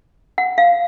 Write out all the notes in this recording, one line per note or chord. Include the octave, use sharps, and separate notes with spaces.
F#5
F5